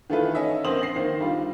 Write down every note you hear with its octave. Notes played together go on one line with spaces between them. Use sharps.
D#3 E3 A3 F4 A4 B4
C#4 D#5 E5
A#1 A#3 C4 C5 D#6 F#7
A#6 C7
D#3 A#3 C5
D3 G3 F4